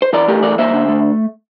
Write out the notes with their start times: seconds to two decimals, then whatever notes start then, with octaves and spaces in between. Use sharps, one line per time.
0.02 C5
0.13 E3 A#4 D5
0.28 A3 G4 A#4
0.43 E3 A#4 D5
0.58 A#3 C5 E5
0.73 D3
0.88 A3